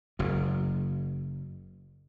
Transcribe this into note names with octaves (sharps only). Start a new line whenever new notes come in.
F#1 F#2